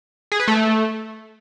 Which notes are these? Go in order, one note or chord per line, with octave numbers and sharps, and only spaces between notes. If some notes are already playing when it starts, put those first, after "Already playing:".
G#4
B4
A3